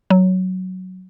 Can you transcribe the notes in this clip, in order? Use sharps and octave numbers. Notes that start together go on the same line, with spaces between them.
F#3